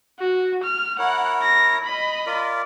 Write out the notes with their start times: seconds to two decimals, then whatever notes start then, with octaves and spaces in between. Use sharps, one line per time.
0.19 F#4
0.64 F6
0.99 E4 A#4 C#5 F#5
1.43 A#6
1.84 D#5 B5
2.26 F4 A#4 D5